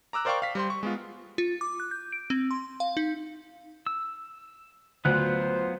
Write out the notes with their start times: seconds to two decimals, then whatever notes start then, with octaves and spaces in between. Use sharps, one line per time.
0.13 A#5 D6 E6 F#6
0.25 A#4 C5 D5 F5 G5 C#6
0.42 F5 B6
0.55 G3 C5 C6
0.70 C#6
0.83 G#3 B3 F4
1.38 F4
1.61 D6
1.80 F#6
1.91 G6
2.12 D7
2.30 C4
2.51 C6
2.80 F5
2.97 D#4
3.87 E6
5.05 D2 F#3 B3 F4 C5 F#6